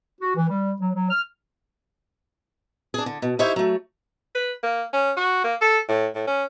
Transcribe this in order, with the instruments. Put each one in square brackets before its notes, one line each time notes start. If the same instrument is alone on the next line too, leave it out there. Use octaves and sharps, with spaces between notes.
[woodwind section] F#4
E3
G3
F#3
F#3
F6
[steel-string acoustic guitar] D4 G#4
D3
B2
D#4 E4 G4 C5 C#5 E5
F#3 A3
[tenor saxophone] B4
A#3
C#4
F#4
A#3
A4
A2
A2
C#4